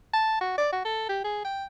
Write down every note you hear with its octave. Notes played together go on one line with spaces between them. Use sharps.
A5
F#4
D5
F#4
A4
G4
G#4
G5